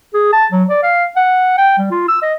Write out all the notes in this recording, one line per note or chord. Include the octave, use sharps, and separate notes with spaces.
G#4
A5
F#3
D5
F5
F#5
G5
G3
F4
E6
D#5